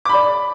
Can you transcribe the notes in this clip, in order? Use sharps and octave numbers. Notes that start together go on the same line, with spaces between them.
D5 B5 D6